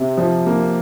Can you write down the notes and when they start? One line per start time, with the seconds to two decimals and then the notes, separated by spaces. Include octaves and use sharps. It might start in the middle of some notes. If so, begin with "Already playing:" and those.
Already playing: C3
0.17 F3
0.46 A#3